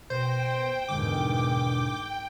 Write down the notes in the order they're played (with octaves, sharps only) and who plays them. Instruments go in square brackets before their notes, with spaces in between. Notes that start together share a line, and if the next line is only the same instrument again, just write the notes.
[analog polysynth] B2 A#6 [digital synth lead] C5 [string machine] G5
[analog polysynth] E2 B2 D3 [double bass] G#2 D#3 [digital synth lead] D6